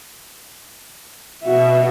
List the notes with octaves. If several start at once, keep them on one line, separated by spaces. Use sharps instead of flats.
B2 F#4 E5